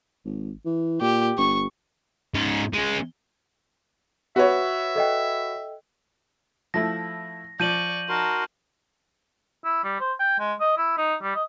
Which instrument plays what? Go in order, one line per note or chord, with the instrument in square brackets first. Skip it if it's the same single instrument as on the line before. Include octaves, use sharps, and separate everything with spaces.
[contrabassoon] G#1
E3
[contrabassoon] A#2 [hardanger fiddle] G4
[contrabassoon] G1 [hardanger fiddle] C#6
[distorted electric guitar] G#2 C#4
G#3 C#4
[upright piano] F#4 B4 C#5 [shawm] E5
[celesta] A4 D#5 G5
[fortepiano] F3 A3 E4 [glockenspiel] A#6
[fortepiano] F3 [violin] D5 C#6 [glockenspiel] G6 D#7 F#7
[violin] D#4 A5 [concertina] F#4 A#4 C6
[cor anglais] E4
G3
C5
G5
G#3
D#5
E4
D#4
G3
D#5